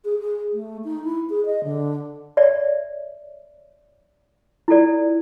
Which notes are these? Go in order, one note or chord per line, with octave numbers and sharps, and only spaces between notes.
G#4
G#4
A3
D#4
E4
G#4
D#5
D3
C#5 D5 E5
E4 F4 A4 D5